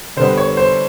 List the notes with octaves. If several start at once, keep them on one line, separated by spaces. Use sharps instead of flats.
D3 G3 B3 C5
C#5
C5